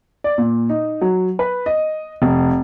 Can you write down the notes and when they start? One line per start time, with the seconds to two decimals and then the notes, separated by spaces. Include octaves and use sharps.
0.24 D5
0.38 A#2
0.70 D#4
1.01 F#3
1.39 B4
1.66 D#5
2.22 F1